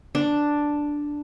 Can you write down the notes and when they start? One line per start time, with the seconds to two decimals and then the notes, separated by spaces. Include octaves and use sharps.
0.15 D4